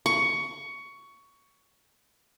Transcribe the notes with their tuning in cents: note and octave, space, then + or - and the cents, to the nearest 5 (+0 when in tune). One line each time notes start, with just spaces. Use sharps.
C#6 +15